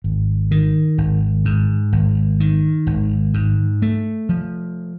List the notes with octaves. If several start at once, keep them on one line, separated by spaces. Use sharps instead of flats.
G#1
D#3
G#1
G#2
G#1
D#3
G#1
G#2
A3
F3